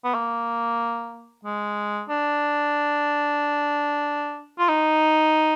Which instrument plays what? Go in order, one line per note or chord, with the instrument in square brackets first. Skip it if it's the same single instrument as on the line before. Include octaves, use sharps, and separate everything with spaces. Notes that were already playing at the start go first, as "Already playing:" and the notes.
[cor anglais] B3
A#3
G#3
D4
F4
D#4